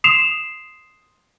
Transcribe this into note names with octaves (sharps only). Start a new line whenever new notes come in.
C6 D#6 C7 E7 F7